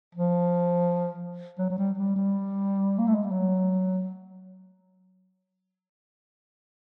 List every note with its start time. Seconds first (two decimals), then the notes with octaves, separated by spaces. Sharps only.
0.15 F3
1.58 F#3
1.70 F#3
1.78 G3
1.98 G3
2.16 G3
2.99 A#3
3.07 A3
3.15 G#3
3.24 G3
3.31 F#3